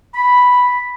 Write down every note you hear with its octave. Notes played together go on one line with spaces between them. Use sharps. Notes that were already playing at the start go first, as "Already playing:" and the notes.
B5